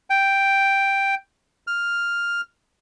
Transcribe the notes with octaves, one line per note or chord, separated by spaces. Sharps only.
G5
F6